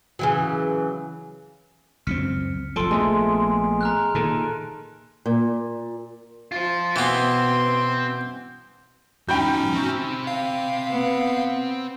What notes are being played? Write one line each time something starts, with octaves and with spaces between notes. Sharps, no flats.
C#3 E3 F#3
C#2 F#2 C4 F6 B6 C#7
F1 F3 A4 C6 D7
A#1 G#3 A3 B3 E5
A#5 F6 F#6
A#2 D#3 A4
A#2
F4 C5
B2 E3 B3 C4 C6
E2 G#2 C#4 D#4 F#4 G5 B5 G6
C4 E5
F5
B3